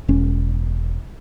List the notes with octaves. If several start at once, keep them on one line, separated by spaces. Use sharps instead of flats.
E1 C#4